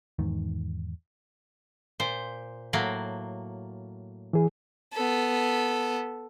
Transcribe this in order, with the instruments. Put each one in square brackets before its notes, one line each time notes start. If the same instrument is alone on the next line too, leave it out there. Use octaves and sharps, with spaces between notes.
[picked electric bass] E2 G#2 D#3
[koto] A#2 C5
A2 F#3 A#3
[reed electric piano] E3 G#4
[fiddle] B3 A4